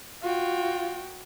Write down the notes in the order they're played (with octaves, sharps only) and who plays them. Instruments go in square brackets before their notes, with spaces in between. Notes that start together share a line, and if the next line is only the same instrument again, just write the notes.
[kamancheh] F4 [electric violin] F#4 G5